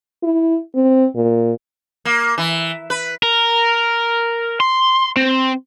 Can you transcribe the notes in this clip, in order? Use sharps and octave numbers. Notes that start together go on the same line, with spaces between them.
E4
C4
A#2
A#3
E3
B4
A#4
C6
C4